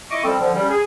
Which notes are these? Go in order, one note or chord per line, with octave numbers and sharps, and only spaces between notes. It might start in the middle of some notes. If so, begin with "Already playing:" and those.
E4 D#5 C#6 D6
F3 G3 C4 A4
D3 F3
G3 C#4
G#4